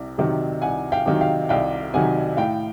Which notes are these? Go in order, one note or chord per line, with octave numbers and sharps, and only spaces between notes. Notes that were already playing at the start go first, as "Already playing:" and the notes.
Already playing: C2 C3
C3 D#3 F#3
C2 F#5 G#5
F5 G5
C3 D#3 F#3
F5 G5
C2 F5 G5
C3 D#3 F#3 F#5 G#5
A2 F5 G5